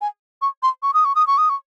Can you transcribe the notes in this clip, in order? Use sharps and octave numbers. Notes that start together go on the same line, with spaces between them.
G#5
C#6
C6
C#6
D#6
C#6
D#6
C#6
D#6
C#6